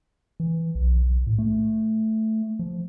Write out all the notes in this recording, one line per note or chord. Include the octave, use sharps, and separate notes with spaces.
E3
B1
A2
A3
F3